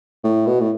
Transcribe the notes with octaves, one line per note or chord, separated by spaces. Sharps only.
A2
B2
A2